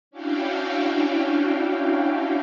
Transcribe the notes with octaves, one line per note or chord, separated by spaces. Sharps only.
C#4 D4 E4 F#4 F5 G5